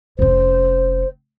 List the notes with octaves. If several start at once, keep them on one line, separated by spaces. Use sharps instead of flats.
F1 C#4 C5